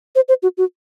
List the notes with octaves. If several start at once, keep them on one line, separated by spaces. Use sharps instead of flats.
C5
C5
F#4
F#4